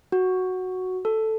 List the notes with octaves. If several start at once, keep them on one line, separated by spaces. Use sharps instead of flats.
F#4
A4